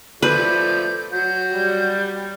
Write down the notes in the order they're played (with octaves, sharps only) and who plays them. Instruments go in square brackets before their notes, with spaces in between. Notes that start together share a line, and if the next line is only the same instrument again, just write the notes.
[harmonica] F3 A3 D5 [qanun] B4 [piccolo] G6
[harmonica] F#3 F#4 [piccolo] G6
[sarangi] G3